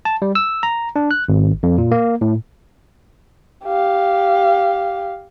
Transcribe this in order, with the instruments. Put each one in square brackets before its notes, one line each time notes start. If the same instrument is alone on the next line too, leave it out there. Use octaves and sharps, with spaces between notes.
[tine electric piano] A5
G3
E6
A#5
D4
F#6
G#1
F2
A#2
A#3
A2
[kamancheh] G4 F5